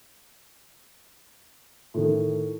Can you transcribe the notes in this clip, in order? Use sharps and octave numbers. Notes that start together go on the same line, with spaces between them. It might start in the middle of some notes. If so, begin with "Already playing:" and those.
A2 D#3